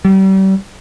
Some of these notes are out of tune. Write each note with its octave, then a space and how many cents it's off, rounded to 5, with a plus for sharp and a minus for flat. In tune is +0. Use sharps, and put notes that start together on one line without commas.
G3 -35